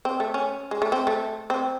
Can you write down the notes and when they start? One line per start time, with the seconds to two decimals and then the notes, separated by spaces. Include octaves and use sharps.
0.05 C4
0.20 A3
0.34 C#4
0.71 G#3
0.82 A3
0.92 C4
1.07 A3
1.50 C4